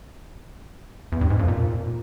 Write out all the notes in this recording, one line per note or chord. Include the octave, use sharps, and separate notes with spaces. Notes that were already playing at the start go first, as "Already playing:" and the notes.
E2
G2
G#2
F2
A#2